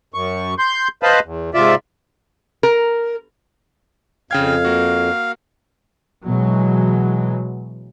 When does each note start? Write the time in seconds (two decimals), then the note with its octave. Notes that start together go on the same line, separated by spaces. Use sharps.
0.14 F#2 C#6
0.59 C6 G6
1.03 B4 C5 D#5 F5 A5 B5
1.25 E2
1.54 G#2 C3 F4 D5 E5
2.63 A#4
4.31 F2 C#3 F5 G5 G#6
4.65 A#3 F#4
6.24 B2 E3 F#3 G#3